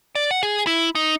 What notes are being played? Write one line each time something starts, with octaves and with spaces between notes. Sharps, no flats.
D5
F#5
G#4
E4
D#4